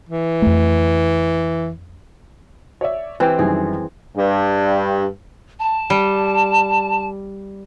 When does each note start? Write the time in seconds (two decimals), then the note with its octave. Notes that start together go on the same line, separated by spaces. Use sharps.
0.09 E3
0.42 F2 A3
2.81 C#5 D5 E5
3.20 E3 C4 G4 B4 G5
3.39 F#2 D#3 G3 G#4
4.16 G2
5.60 A5
5.90 G3